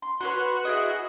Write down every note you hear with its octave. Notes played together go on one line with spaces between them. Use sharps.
C6
F#4 B4 C#5 C6
E4 G#4 D#5